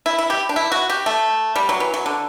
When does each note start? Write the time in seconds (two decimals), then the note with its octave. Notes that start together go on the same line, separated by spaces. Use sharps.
0.06 E4
0.18 E4
0.30 G4
0.49 D4
0.56 E4
0.72 F#4
0.89 G4
1.06 A3
1.56 G3
1.69 F#3
1.80 E3
1.94 F#3
2.06 D3